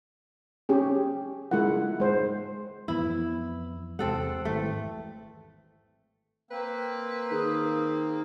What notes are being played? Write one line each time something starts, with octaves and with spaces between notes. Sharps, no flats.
C#4 G4 G#4
G#3 E4 F4 A#4 F#5
G#3 C5
F2 E3 B3 E4
E2 C3 G#3 C4 A4 F#5
G#1 E3 A3
A#3 C4 B4
D#3 G#4